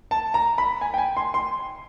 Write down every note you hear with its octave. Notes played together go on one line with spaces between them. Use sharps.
A5
A#5
B5
G#5
G5
G#5
C6
C6